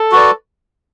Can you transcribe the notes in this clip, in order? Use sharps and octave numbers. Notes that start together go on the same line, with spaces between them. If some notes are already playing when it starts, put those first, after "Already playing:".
Already playing: A4
F#4 B4 D5